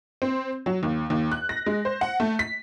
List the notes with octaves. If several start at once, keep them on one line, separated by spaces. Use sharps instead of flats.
C4
F#3
D#2
D#2
F#6
A#6
G#3
C5
F#5
A3
B6